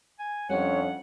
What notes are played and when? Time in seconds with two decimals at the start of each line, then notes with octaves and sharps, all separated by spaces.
0.19 G#5
0.50 F2 G3 C#4 D4 C#5 F#5